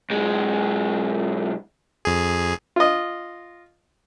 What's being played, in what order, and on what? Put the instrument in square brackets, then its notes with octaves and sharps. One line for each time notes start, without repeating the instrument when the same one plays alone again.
[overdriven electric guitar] B1 G#3
[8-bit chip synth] F2 G#4
[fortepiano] F4 D#5